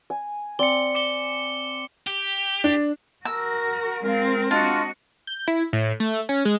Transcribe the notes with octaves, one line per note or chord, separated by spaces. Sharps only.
G#5
C4 D5 C#7 G7
D6 C#7 G7
G4
D4
F#4 A#4 E6
G#3 C4 F4 A#4
D4 F4 F#4 D#5
G6
E4
A2
A3
C#4
G#3